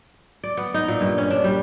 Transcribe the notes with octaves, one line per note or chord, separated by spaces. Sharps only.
D5
B3
D#4
A#2
G2
C#4
D4
G3